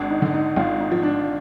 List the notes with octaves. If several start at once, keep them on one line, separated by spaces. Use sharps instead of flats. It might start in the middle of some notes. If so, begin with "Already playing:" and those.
Already playing: G#1 D4
D#4
D3
D#4
G#1 F4
D#4
F3
D4